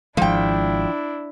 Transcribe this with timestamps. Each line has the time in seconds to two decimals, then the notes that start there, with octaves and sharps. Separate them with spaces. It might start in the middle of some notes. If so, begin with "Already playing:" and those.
0.17 G#1 F3 G#3 D4 E4 G5